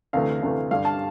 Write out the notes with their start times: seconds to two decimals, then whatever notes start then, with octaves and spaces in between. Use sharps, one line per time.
0.13 D2 C3 E3 A3 F5
0.42 D2 C3 E3 A3
0.71 G2 D3 G3 F5
0.85 A5